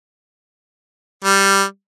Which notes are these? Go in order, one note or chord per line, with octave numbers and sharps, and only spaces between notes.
G3